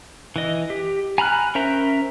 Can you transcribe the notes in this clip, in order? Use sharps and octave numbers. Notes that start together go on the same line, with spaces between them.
E3 D#5
G4
G#5 A#5 B5 F6 F#6
C#4 A#4 C5 E5 A#5